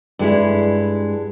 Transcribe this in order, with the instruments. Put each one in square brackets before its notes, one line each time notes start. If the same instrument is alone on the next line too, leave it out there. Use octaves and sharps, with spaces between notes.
[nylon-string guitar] G2 G#3 E4